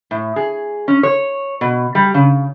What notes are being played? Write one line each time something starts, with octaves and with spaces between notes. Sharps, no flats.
A2
G#4
C#4
C#5
B2
G3
C#3